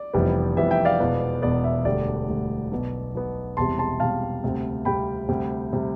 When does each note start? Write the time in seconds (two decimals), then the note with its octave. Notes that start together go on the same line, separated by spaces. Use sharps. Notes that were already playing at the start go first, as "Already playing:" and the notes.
Already playing: D5
0.14 F1 F2 E3 G3 B3
0.57 F1 F2 E3 G3 B3 E5
0.71 E5 G5
0.85 D5 F5
1.00 E1 E2 B2 B3
1.42 E1 E2 B2 B3 D5
1.64 E5
1.85 E1 D2 D3 G3 D5
2.28 E1 D2 D3 G3
2.72 B1 B2 B3
3.14 B1 B2 B3
3.57 E1 E2 C3 G3 A5 C6
3.79 A5 C6
4.00 E1 E2 C3 G3 F5 A5
4.43 D2 C3 G3 C4
4.85 D2 C3 G3 C4 G5 B5
5.29 D2 C3 G3
5.73 C3 G3